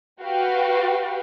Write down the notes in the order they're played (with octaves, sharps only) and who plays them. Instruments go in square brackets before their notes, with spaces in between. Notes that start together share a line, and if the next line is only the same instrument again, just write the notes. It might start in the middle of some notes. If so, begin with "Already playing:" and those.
[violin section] F#4 G4 B4 F5 G5